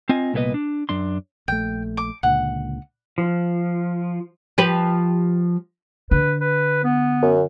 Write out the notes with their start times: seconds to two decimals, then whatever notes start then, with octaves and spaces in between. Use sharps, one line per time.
0.09 C4 F4 D#5 G#5
0.34 C2 A#2 B3 E4 B4 D#5
0.54 D4
0.89 F#2 D4 C6
1.48 A#1 A3 G5
1.97 D6
2.23 C#2 A#2 D3 F#5
3.18 F3
4.58 F3 G4 B4
6.11 D3 B4
6.41 B4
6.84 B3
7.22 F#2